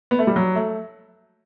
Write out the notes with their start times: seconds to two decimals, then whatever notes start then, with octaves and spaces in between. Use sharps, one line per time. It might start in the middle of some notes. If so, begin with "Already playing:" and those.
0.11 B3
0.19 A3
0.27 G3
0.36 F#3
0.55 A3